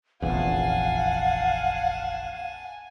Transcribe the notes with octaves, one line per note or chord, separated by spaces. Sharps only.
F1 A#1 E2 F5 F#5 G#5 A5